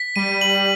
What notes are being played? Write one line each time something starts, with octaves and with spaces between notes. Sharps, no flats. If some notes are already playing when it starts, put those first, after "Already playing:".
Already playing: B6
G3 D#7
F#7